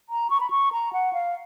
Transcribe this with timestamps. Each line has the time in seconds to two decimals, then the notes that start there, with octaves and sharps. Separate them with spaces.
0.09 A#5
0.30 C#6
0.40 B5
0.50 C#6
0.72 A#5
0.93 F#5
1.13 F5